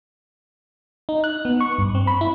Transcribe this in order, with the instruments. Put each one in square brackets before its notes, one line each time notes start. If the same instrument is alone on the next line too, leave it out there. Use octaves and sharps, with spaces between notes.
[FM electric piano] D#4
F#6
B3
C#6
G2
C4
B5
E4